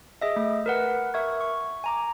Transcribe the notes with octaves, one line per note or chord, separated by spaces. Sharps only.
G#4 D#5 E5
A3
A#4 B4 F#5
A#4 E5 C#6 G#6
C#6
G#5 A#5 D6